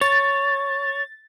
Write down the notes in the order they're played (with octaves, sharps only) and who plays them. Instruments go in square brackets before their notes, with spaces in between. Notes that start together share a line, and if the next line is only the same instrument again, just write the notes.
[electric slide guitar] C#5 [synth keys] A6